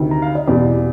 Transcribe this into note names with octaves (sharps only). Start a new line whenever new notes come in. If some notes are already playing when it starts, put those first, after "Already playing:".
Already playing: D2 C3 D#3
A#5
F5
D#5
E2 B2 G3 D5